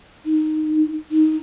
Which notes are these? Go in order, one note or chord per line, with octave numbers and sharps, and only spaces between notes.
D#4
D#4